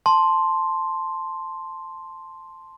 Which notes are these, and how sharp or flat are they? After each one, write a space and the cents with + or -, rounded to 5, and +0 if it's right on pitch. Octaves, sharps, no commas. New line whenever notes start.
A5 +0 C6 +0